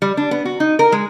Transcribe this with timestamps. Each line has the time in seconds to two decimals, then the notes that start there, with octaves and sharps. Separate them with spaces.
0.02 G3
0.17 D4
0.31 B3
0.45 F#4
0.60 D#4
0.79 A#4
0.92 G#3